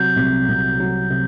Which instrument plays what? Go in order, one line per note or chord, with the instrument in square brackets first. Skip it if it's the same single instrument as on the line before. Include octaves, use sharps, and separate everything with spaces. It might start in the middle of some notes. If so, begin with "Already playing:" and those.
Already playing: [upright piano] C3 F#3 [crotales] G6
[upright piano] C2
C2
F#3
C3